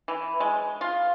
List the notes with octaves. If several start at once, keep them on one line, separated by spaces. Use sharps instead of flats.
E3
G#3
F4